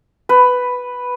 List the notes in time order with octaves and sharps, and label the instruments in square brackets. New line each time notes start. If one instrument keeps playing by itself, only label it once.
[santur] B4